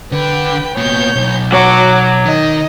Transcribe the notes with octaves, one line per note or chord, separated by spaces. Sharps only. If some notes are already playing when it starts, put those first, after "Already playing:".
D3 B4 G5
A#2 B3 C#5 G6
B1
F#3 C#5 F#5 D6
D#3 D#5